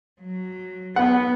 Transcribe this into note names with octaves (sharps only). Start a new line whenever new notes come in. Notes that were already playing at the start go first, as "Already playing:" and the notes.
F#3
B3 F#5